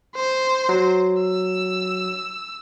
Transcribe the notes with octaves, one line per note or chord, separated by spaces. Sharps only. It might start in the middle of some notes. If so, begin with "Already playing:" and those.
C5
F#3
E6